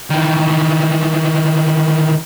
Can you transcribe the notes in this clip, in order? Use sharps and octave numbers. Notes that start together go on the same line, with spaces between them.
D#3 E3